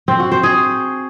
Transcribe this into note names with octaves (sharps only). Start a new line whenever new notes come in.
C4
F#4
C5
G#4